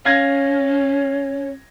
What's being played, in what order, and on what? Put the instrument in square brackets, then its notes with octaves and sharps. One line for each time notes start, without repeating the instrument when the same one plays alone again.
[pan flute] C#4 [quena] C#5 [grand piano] F5 G#6 A#6